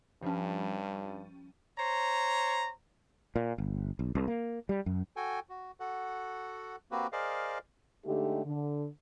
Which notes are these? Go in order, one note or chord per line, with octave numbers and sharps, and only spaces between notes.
G2 F3 G3 C#4
C5 C#5 A#5
A#2
G1
B1
C2
A#3
G3
F#2
F#4 A4 G5 G#5
F#4
F#4 A4 F#5
A#3 C4 F#4 G4 B4
G#4 A#4 C5 D5 D#5 F5
D3 G#3 A3 D#4 G4
D3